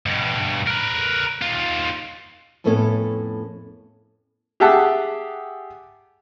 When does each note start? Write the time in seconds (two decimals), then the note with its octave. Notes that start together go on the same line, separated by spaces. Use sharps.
0.06 G2 B2
0.67 A#4 B4
1.42 D#2 F4
2.64 F2 A2 A3 B3 C#4 A4
4.60 G4 G#4 E5 F#5 A5